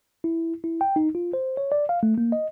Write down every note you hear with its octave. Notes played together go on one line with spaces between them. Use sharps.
E4
E4
G5
D#4
F4
C5
C#5
D5
F5
A3
A#3
D#5